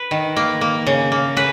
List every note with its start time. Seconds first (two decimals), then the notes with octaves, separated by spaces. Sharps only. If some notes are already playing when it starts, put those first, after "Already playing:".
Already playing: B4
0.11 D#3
0.36 A#3
0.61 A#3
0.86 C#3
1.12 A#3
1.36 C#3 B4